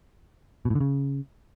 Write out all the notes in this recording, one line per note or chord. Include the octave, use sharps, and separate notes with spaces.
B2
A2
D3
C#3